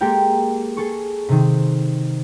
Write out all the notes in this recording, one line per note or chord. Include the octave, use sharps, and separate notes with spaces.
G#3 A#3 G4 A4 A#4 G5
G#4 A4 C#6
C3 D#3